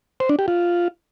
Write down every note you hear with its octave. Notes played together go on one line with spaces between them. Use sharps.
C5
D4
G4
F4